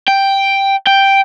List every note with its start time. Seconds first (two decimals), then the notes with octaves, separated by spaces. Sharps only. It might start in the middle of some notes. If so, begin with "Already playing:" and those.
0.08 G5
0.87 G5